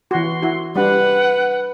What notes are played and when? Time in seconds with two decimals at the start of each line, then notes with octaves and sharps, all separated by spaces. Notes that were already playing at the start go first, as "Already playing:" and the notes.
0.11 E3 F#4 C6
0.42 E4 F#4
0.76 G3 D4 B4 F#5